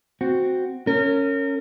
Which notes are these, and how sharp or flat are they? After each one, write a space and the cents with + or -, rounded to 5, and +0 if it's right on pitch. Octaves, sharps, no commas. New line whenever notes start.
C4 +0 F#4 +0
C#4 +0 A#4 -30